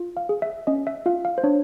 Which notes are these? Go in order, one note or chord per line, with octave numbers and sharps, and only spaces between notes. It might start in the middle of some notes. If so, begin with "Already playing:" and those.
Already playing: F4
F5
G#4
E5
C#4 D#5
E5
F4 F5
F5
C5
D4 C#5